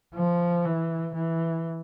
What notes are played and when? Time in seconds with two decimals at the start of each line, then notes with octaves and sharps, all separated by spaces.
0.15 F3
0.65 E3
1.14 E3